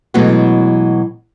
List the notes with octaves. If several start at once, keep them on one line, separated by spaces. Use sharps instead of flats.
B2 E3 F#3 G#3 A3 B3